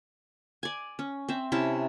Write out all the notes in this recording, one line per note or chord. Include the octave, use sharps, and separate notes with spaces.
D5 G#5
C#4
C4 E5
C3 C#4 E4 A5